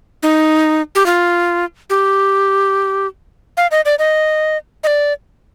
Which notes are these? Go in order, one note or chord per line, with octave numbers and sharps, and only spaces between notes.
D#4
G4
F4
G4
F5
D#5
D5
D#5
D#5
D5